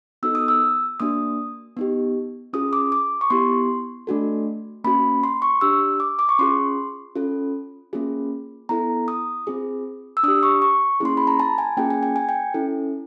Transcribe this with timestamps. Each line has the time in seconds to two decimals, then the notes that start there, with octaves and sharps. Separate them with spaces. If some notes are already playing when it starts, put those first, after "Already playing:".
0.23 B3 D#4 F#4 A4 E6
0.35 D#6
0.48 E6
1.00 A#3 D4 F#4 D#6
1.77 B3 D#4 G4
2.53 C#4 F4 G#4 D#6
2.73 D6
2.92 D6
3.21 C#6
3.30 B3 E4 G4 C6
4.07 A3 D4 F#4 A4
4.84 A#3 C#4 F#4 B5
5.23 C6
5.42 C#6
5.61 D4 G4 E6
6.00 D6
6.19 D6
6.29 C#6
6.39 C#4 F4 G#4 C6
7.16 C#4 F4 A4
7.93 A#3 C#4 F4 G#4
8.69 B3 E4 A4 A#5
9.08 D#6
9.47 C4 F4 G#4
10.17 E6
10.23 D4 D#6
10.28 G4
10.43 C#6
10.62 C#6
11.00 A#3 C#4 E4 G#4 C6
11.17 B5
11.27 A#5
11.40 A5
11.58 G#5
11.77 A#3 C#4 F4 G#4 G5
11.90 G#5
12.03 G5
12.16 G#5
12.29 G5
12.54 C#4 E4 A4